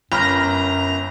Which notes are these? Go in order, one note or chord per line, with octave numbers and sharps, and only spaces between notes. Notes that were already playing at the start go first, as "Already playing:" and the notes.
G1 F#2 A#5 B5 F6